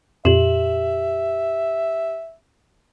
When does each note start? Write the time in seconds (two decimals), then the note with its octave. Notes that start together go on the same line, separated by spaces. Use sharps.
0.25 F2 A#2 G4 E5 E7 F#7